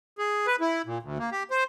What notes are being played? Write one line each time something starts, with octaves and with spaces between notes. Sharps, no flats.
G#4
B4
E4
A#2
D2
A#3
G4
C5